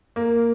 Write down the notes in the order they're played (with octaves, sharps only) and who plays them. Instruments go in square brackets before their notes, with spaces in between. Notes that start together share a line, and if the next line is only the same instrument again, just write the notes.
[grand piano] A#3